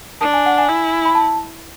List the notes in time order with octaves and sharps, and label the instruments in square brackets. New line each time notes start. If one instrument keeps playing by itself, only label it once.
[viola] D4 [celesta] A5
[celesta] G#5
F#5
G#5
[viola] E4
[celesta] B5
A5